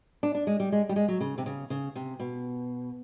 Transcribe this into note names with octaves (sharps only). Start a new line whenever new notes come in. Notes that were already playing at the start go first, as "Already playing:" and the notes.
D4
D4
G#3
G3
G#3
G3
G#3
F#3
C#3
C3
C#3
C#3
C3
B2